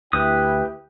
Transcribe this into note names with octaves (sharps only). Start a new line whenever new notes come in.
D2 E4 G4 B4 G5 D#6